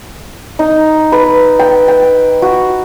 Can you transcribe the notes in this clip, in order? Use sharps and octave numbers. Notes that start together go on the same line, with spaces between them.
D#4
B4
G5
G5
F#4